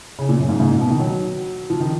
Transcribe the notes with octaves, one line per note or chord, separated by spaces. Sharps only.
C#3
A#2
F#2
G#2
G#2
A#2
B2
D#3
F#3
F3
D#3